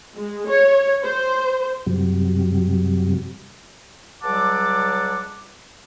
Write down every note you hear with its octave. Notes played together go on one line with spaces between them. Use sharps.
G#3
C#5
C5
F#2 C3 F#3 G3
C#2 F#3 G3 F#5 A5 D6